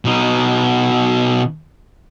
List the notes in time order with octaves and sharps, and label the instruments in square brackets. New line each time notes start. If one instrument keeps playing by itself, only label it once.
[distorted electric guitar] B2 D#4